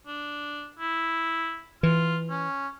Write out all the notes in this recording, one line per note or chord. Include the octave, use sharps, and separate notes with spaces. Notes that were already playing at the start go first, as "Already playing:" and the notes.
D4
E4
E3 F4
C#4